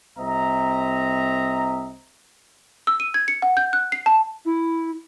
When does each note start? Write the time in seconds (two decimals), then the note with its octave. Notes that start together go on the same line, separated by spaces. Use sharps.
0.19 C2 C4 D#5 E5 A#5
2.87 E6
3.00 D#7
3.14 G#6
3.28 C#7
3.42 F#5
3.57 G6
3.73 F#6
3.92 C7
4.06 A5
4.45 E4